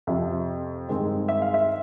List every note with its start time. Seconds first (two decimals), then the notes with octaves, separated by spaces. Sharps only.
0.07 F2 C3 F3 E5
0.89 G2 D#3 G#3 C4
1.29 E5
1.42 F5
1.54 E5